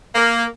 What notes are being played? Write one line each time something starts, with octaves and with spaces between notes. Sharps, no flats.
A#3